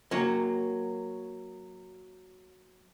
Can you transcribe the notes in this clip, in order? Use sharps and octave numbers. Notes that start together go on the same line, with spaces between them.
F#3 A#3